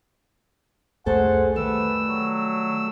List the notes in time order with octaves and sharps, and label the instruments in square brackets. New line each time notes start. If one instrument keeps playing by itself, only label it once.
[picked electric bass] C2 F2 A3 [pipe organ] G#4 [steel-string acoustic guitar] A4 C5 C#5 [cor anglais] F#5
[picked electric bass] D#3 [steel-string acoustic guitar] G3 [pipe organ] A3 E6 [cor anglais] B4
[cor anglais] F#3